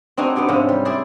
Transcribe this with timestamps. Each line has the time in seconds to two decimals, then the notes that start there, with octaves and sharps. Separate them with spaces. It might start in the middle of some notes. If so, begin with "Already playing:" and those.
0.17 C4 D4 D#4 F#4 G#4
0.36 B3 D#4 G4 G5
0.48 G#2 C3 F3 C#4
0.69 G3
0.85 E4 G#4 C5 D5